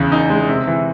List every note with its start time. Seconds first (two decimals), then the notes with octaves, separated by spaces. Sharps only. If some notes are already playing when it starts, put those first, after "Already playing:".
Already playing: E2 C#3
0.12 D#4
0.30 G#3
0.48 C3
0.67 E3